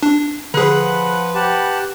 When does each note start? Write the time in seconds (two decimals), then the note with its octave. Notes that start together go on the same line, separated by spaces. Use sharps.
0.03 D4
0.54 D3 F3 G#4 B4 F#5
1.35 G4 F#5 A5